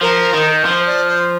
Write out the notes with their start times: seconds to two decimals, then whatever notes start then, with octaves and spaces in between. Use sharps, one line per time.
0.01 F3 A#4
0.34 D#3
0.65 F3 C5
0.86 D5
1.08 C5